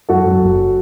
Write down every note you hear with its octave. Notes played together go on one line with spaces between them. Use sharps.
F#2 F#4 A4
F#2
F#1